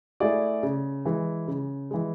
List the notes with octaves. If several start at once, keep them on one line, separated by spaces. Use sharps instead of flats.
A3 E4 G#4 D5
C#3
E3 G#3
C#3
E3 G#3